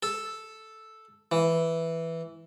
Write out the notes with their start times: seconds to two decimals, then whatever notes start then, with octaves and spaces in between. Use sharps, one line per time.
0.03 A4
1.32 E3